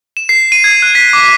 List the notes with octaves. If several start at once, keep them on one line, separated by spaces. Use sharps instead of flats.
E7
C7
D#7
G#6
F#6
B6
D6